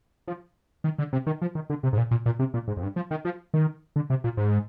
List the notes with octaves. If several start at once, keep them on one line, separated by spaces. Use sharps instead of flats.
F3
D#3
D3
C3
D#3
F3
D#3
D3
C3
G#2
A#2
A#2
A#2
C3
A#2
G#2
F2
G2
F3
D#3
F3
D#3
D3
C3
A#2
G#2